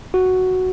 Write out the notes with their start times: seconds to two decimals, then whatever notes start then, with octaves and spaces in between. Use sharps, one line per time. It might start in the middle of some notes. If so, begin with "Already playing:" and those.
0.14 F#4